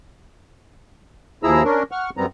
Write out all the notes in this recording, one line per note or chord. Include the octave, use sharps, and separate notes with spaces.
D#2 F3 E4 G#4 A#5 E6
C#4 D4 A#4
F#5 C#6 F6
F#2 G3 B3 C4 A#5